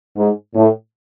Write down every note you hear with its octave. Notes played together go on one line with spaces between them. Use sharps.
G#2
A2